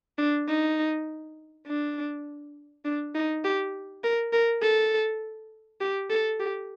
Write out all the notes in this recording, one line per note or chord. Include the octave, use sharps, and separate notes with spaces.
D4
D#4
D4
D4
D#4
G4
A#4
A#4
A4
G4
A4
G4